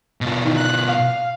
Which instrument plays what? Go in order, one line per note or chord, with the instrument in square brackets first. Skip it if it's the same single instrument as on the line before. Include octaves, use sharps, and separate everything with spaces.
[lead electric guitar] B2 F4
[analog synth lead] D#3
F#6
F5